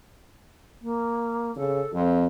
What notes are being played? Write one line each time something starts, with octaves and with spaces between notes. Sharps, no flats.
A#3
C#3 A4
F2 C4